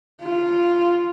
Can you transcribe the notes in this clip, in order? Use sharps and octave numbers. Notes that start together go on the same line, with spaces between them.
F4